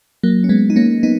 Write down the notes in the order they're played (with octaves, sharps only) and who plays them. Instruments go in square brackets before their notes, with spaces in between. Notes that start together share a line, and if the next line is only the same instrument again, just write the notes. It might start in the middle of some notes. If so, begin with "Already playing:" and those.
[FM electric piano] F#3 A#3
C#4
G#3 B3
D#4
A#3 C#4
B3 D#4